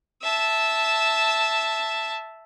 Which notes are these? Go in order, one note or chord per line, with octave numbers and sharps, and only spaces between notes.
E5 A5